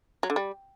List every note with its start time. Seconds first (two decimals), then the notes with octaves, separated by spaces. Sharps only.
0.23 F#3
0.30 D3
0.36 G3